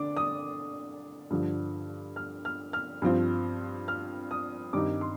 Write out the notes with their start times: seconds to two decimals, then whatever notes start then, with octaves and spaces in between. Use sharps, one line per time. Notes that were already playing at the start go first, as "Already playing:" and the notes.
Already playing: D3 D4 D6
0.17 D#6
1.30 G2 D3 F3
2.16 F6
2.45 F6
2.73 F6
3.02 G2 F3 C4 F4
3.88 F6
4.31 D#6
4.73 G2 D#3 G3 C4 D#4 D6
5.01 C6